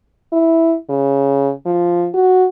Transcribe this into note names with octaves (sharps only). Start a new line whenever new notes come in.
E4
C#3
F3
F#4